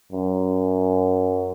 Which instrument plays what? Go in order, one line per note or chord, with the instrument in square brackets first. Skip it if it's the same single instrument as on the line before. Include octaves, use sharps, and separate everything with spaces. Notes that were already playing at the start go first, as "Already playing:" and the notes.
[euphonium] F#2